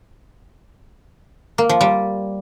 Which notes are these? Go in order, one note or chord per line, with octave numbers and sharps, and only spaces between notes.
A#3
F3
G3